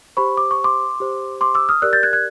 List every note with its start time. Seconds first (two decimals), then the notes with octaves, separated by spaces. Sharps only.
0.17 G4 C5 B5 C#6
0.37 D6
0.51 C#6
0.64 C6 D6
1.00 G4 C5
1.41 C6 D6
1.55 D6 E6
1.69 D#6 F6
1.82 G4 A#4 D5 E6 F#6
1.93 G6 A6
2.03 F#6 G#6
2.13 F#6 G#6